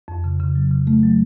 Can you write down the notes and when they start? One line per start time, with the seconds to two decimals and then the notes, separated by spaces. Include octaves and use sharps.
0.08 F2
0.24 C#3
0.40 C#3
0.55 F#3
0.71 C#3
0.87 A3
1.03 F#3